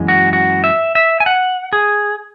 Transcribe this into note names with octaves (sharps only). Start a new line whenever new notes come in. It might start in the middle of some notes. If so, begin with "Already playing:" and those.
Already playing: F#2 E3 G#3
F#4
F#4
E5
E5
G#5
F#5
G#4